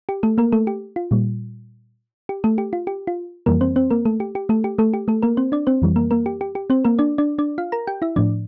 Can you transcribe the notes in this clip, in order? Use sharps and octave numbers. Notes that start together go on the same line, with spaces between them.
G4
A3 A4
A#3 A#4
A3 A4
G4
F4
A#2 G3
G4
A3 A4
G4
F4
G4
F4
F2 E3 G3 A#3 A#4
C4 C5
C4 C5
A#3 A#4
A3 A4
G4
G4
A3 A4
G4
A3 A4
G4
A3 A4
A#3 A#4
C4 C5
D4 D5
C4 C5
F2 E3 G3
A#3 A#4
A#3 A#4
G4
G4
G4
C4 C5
A#3 A#4
D4 D5
D4 D5
D4 D5
F4 F5
A#4 A#5
G4 G5
E4 E5
A2 F3 D4 D5